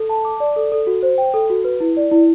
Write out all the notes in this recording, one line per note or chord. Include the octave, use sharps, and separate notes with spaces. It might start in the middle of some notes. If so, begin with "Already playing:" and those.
Already playing: A4
A5
D6
D5
A4
A4
F#4
C5
G5
A4
F#4
B4
E4
D5
E4